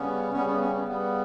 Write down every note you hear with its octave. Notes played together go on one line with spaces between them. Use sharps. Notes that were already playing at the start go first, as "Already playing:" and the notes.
Already playing: C#3 G3 B3 C#4
C#3 G3 B3 C#4
B3
C#4
B3
C#3 G3 B3